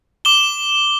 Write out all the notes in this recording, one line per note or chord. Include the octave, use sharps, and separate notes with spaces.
D6 E7 G7